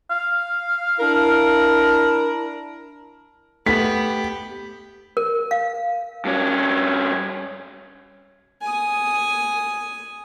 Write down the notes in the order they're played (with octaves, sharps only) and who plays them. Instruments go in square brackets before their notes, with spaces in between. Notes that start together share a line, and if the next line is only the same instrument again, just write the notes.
[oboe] F5
[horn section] D4 E4 A#4
[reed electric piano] A3 [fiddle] B3 [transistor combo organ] G4 [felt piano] B6
[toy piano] A#4
F5
[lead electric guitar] G2 C#4
[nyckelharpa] G#5 D#6